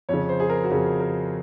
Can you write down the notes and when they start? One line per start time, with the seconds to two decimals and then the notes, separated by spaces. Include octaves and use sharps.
0.09 F2 C#3 C#5
0.29 C5
0.40 G#4
0.50 A#4
0.64 F#4
0.70 F2 C#3 G#4
1.00 A#4